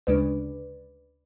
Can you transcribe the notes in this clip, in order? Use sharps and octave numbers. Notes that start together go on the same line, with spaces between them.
D2 C#3 G#3 D4 B4 D5